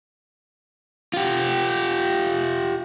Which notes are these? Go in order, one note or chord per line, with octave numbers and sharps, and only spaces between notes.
F4 G4